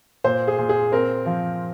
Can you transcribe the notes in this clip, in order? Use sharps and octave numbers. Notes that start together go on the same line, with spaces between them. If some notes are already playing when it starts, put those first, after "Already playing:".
A#2 C5
G#4
A#2
G#4
C4 A#4
F3